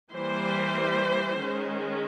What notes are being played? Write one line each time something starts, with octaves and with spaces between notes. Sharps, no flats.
E3 G3 A#3 C5
D#3 G#3 C#4